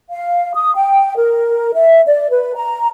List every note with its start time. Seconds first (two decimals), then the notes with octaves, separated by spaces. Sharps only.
0.10 F5
0.55 D#6
0.76 G5
1.17 A#4
1.74 E5
2.06 D5
2.30 B4
2.56 A#5